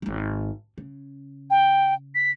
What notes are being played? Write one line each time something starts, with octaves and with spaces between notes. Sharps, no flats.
D#1 G#1
C#3
G5
B6